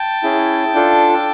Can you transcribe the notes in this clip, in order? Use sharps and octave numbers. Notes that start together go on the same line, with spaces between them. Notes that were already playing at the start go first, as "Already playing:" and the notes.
Already playing: G5 A5
C#4 E4 G#4
D4 F4 A4